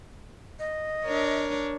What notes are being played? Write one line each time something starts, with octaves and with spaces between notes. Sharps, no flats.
D#5
D4 A#4 C#5